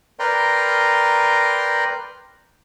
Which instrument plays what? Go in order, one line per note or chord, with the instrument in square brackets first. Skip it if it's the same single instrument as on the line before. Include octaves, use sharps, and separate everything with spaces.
[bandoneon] A#4 B4 D5 G5 A#5 C6